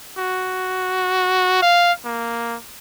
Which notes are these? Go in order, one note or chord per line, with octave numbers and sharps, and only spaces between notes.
F#4
F5
A#3